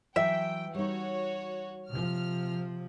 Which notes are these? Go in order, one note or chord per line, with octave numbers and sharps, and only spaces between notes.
E3 F#3 E5 G5
G3 D#4 F#4 C#5
C3 F3 F6